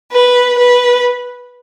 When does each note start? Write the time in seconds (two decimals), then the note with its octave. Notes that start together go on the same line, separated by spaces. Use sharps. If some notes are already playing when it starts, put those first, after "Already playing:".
0.12 B4
0.58 B4